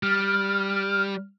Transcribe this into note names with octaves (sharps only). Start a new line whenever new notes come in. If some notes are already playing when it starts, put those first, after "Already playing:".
G3 F6